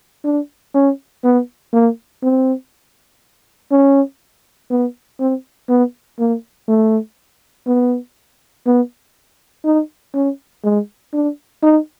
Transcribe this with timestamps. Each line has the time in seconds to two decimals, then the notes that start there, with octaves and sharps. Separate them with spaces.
0.25 D4
0.75 C#4
1.24 B3
1.73 A#3
2.23 C4
3.71 C#4
4.70 B3
5.20 C4
5.69 B3
6.19 A#3
6.68 A3
7.67 B3
8.66 B3
9.65 D#4
10.14 C#4
10.64 G#3
11.13 D4
11.63 D#4